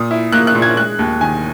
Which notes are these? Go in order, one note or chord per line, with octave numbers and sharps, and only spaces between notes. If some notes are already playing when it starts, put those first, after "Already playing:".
Already playing: A#2 D#6
E4
A#3 F#6
F#6
A#2
G#6
G#3 F#6
D#2
D#3 G#5